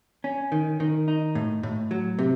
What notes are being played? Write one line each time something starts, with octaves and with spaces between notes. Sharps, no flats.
C#4
D#3
D#3
D#4
A2
A2
F#3
C3